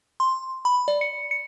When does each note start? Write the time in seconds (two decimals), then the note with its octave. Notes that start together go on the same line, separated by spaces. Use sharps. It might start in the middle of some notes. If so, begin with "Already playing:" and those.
0.20 C6
0.65 B5
0.88 D5
1.01 C#7
1.31 C#7